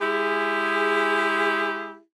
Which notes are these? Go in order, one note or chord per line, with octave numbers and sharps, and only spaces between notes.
G#3 E4 G4 G#4